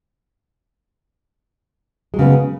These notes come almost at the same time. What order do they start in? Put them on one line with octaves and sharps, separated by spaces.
G#3 F#3 C#3 B3